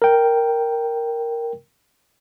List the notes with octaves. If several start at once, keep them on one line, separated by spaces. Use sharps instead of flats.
A#4 G5